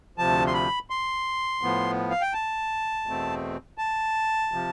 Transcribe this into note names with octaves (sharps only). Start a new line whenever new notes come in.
D2 C3 F3 A5
C6
B5
C6
A2 F3 B3
F5
G5
A5
E2 B2 A3 C4
A5
C3 F3